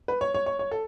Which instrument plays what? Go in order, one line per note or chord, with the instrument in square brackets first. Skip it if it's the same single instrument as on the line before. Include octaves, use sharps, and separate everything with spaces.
[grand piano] B4
C#5
C#5
C#5
C#5
A4